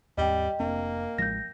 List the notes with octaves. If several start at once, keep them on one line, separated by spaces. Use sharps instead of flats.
D#2 G#2 G3 C4 D#5 G5
F1 A#3 C4 D4
A1 F3 G#3 G6 A#6